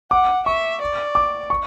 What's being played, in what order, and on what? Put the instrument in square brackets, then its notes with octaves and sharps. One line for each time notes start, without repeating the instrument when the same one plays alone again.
[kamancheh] F#5 [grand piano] D6
[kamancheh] E5 [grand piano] C#6
[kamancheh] D5
[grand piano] D6
C#6